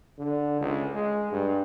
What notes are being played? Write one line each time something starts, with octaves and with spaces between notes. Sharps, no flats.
D3
C#2
G#3
G2